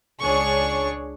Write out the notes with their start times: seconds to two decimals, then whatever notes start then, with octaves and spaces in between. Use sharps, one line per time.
0.20 C#2 D4 G#4 C#5 C#6